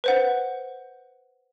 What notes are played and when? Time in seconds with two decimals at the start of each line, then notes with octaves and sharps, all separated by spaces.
0.04 B4 C5 F#5